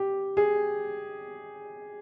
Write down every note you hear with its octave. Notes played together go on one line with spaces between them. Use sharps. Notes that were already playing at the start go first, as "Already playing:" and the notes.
Already playing: G4
G#4